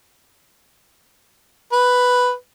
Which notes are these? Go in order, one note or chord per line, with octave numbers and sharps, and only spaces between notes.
B4